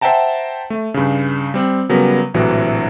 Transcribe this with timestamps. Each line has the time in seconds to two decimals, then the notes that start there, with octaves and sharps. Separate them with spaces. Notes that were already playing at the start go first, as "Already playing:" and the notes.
0.01 C5 E5 F#5 G5 A5 A#5
0.70 A3
0.94 G2 C#3
1.54 G3 C4
1.89 C#3 F#3 G3 B3 A#4
2.34 A#1 A2 C3 E3 F#3